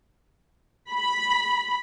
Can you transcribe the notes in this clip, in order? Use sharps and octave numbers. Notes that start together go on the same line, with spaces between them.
B5